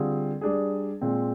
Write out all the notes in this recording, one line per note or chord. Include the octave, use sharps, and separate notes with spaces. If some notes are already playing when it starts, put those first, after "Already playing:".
Already playing: D3 G3 C4 F4 G#4
G3 D4 G#4
A#2 G#3 C4